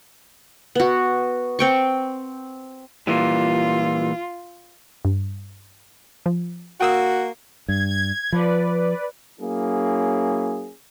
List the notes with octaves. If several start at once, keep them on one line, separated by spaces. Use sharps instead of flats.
B3 F#4
C4 G5 C#6
A#2 E3 G3 F4
G2
F3
A#3 F#4 G5 D#6 E6
G2 G#6
G#6
F3 B4 D5
F#3 A#3 C#4 E4 G#4